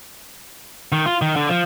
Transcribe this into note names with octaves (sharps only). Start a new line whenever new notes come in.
D#3
F4
D#3
D3
F3